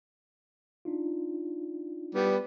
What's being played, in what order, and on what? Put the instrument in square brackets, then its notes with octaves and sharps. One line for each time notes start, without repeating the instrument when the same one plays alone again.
[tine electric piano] D4 D#4 F4
[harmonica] G3 B3